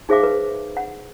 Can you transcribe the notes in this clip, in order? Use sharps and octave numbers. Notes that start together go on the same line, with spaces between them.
D#4 G#4 C5 E5 F5 D6
B4
F#5